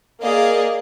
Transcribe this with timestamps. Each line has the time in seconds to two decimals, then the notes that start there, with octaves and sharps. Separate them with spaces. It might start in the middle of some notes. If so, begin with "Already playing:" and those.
0.21 A#3 G#4 D5 D#5 F5